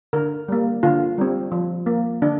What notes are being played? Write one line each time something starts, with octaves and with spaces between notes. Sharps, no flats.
D3 A#4
G3 A#3
D3 F4
G3 C4
F3
A#3
D3 D4